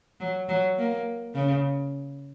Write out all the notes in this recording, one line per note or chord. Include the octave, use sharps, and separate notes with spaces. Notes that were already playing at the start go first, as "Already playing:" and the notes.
F#3
F#3
A#3
C#3